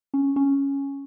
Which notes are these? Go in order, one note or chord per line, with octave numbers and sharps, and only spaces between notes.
C#4
C#4